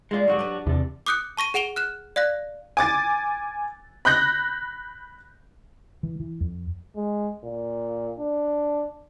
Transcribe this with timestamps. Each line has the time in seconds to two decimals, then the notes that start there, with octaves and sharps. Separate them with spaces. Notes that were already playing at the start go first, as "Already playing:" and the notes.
0.11 G#3 A#3 F4 D5
0.28 G#2 D3 F#3 G3 F#4 G4
0.39 D4 B4
0.67 E2 C3 D5
1.06 D6 D#6 F#6 G6 C#7
1.37 A5 C#6 A#6 D#7
1.54 G#4 F#5 D7 F7 G7
1.76 F6 F#6 E7
2.16 D5 F5 F#6 A#6
2.77 G#5 D6 A6
4.05 B5 F#6 G6 A#6
6.03 E3
6.20 E3
6.41 F2
6.96 G#3
7.44 A#2
8.19 D4